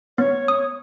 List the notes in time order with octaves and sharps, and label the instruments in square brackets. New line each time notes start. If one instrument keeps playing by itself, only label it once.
[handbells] B3 [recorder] C#5
[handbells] D#6